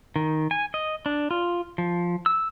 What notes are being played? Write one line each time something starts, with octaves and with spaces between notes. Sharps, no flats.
D#3
G#5
D#5
D4
F4
F3
E6